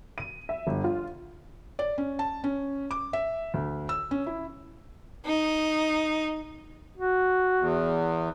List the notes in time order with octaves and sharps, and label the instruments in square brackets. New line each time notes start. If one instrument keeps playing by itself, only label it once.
[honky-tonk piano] D#7
E5
G1
F4
[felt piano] D5
C#4
A5
C#4
D6
E5
D2
E6
C#4
E4
[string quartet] D#4
[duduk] F#4
[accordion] E2